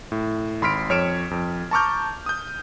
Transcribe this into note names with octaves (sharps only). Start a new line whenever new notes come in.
A2
G#1 B5 C6 F6 B6 D7
F2 C#5 F6 D7 E7
F2
A5 A#5 C#6 D6 F6 G6
D#6 G6